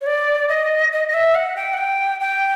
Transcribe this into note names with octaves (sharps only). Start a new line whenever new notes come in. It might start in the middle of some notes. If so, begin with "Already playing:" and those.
C#5
D5
D#5
D#5
D#5
E5
F#5
G5
F#5
G5
G5